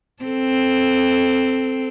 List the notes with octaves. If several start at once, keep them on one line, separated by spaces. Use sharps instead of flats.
C4 A4